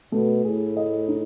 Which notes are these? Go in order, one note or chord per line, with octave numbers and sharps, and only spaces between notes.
B2 A3
A2 G#4
D#5
D#4